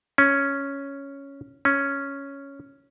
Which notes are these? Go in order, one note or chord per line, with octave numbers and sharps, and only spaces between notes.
C#4
C#4